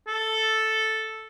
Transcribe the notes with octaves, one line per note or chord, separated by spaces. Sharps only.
A4